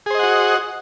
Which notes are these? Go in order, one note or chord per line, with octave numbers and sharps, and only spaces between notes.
F#4 G#4 C5 D#5 F#5